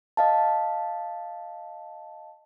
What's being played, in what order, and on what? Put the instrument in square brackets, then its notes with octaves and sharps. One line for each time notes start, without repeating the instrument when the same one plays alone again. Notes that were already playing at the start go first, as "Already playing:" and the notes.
[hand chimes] D#5 F5 A5